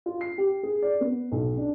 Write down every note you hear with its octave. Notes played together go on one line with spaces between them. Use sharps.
F4
C7
G4
G#4
D5
B3
B1
D4